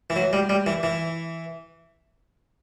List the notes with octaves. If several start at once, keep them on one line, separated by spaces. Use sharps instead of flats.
E3
F#3
G3
G3
E3
E3